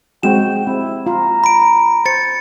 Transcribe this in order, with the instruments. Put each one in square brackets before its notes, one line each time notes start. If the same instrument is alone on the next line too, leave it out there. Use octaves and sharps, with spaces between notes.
[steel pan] G#3 C4 F#4 [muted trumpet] G5 [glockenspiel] E7
[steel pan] C4 [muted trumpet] E4
[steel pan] F4 [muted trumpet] A#5
[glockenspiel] B5 D7
[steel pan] C5 [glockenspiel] A6 C#7